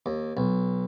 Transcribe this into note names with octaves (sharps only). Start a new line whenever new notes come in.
D#2
B1